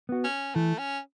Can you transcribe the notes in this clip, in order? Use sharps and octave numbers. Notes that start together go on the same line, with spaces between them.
B3 F#4
C#4
E3 A3
C#4